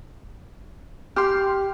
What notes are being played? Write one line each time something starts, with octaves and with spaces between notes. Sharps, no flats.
G4 C6 F6